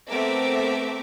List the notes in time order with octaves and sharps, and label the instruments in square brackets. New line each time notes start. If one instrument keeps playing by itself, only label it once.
[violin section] A3 B3 C4 A#4 E5 D6